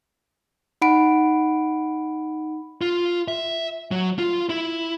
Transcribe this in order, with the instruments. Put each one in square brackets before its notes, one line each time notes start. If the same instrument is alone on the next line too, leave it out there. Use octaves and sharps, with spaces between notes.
[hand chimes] D#4 F#5 B5 D7
[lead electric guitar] F4
E5
F#3
F4
E4